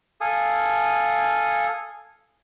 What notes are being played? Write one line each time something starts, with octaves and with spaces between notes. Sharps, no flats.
A4 F5 G#5 D#6